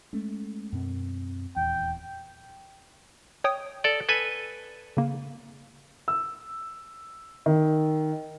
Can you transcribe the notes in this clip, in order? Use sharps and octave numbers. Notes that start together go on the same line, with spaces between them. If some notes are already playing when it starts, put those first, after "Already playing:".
G#3 A3 C#4
F#2 B2 C4
D#1 E2 G5
C#5 G5 D#6
A4 D5
A4 B4 G#5
C#3 A#3
E6
D#3